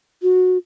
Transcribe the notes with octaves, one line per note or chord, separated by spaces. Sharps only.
F#4